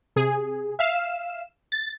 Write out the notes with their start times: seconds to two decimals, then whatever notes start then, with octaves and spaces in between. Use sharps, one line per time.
0.16 C3 G#4
0.79 E5 F5 E7
1.72 A6